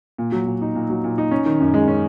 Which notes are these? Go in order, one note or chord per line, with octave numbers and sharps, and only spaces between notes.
A#2
F#3
A#2
D#4
A#2
F#3
A#2
D#4
C#4
D#3
F#2
G#3
C#4